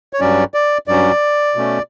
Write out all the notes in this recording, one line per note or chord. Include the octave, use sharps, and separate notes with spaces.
C#5
G2 F#3 C#4 D5
D5
G2 F#3 C#4 D5
B2 A3 C#4